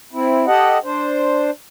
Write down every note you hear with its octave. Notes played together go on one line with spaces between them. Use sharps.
C4 E4
G4 A4 D#5 F#5
D4 C5